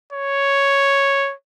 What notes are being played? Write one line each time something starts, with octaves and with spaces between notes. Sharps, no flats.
C#5